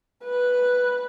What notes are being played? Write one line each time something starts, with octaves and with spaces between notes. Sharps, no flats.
B4